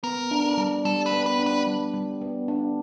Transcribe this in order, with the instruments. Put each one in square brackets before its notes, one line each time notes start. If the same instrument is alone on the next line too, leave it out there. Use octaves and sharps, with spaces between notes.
[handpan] B3 [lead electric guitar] A#4
[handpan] D4
G3
[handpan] G3 [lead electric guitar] A4
[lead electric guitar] B4
[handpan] B3
[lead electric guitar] B4
[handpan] D4
[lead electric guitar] B4
[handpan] G3
G3
B3
D4